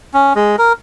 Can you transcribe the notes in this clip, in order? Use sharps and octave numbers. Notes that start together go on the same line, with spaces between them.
C#4
G#3
A#4